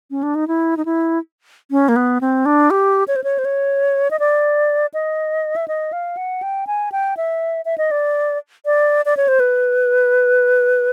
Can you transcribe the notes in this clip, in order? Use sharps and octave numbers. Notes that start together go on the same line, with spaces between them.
C#4
D4
D#4
E4
D#4
E4
C#4
A#3
B3
C4
D4
G4
C#5
C5
C#5
C5
C#5
D#5
D5
D#5
E5
D#5
F5
F#5
G5
G#5
G5
E5
E5
D#5
D5
D5
D5
C#5
C5
B4